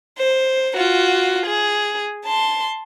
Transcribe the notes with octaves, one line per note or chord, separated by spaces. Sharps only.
C5
F4 F#4
G#4
A5 C6